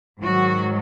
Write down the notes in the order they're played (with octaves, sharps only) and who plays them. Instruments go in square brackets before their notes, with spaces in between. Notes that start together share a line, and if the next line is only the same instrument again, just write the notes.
[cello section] G#2 D#3 F#3 F#4